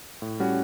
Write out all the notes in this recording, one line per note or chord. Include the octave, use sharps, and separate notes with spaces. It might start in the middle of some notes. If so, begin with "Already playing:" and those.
A2
G3 C#4 F#4